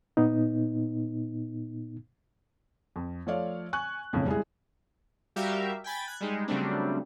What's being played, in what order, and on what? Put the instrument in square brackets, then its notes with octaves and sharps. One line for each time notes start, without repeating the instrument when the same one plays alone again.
[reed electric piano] A#2 B3 D#4
[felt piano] F2
F3 A3 C#5 D5 F5
G#5 C#6 F#6
E1 B1 F2 A2 C#3
G3 G#3 E4 G#4
[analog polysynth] G3 F#4 G4 A#4 E5 F5
G5 G#5 B5 A6
F#6 G#6
G3 G#3 D#4
C#3 F#3 G3 A3 C4 D4